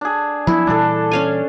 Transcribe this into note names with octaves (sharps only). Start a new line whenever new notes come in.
D4 G#4
F3 F#3 B3 E4
A#2 E3 G3 D4 A4
C#4 F5 G#5